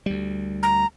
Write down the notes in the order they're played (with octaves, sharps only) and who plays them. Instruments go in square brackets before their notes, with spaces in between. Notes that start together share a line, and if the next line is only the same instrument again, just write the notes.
[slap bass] D2 G3
[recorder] A#5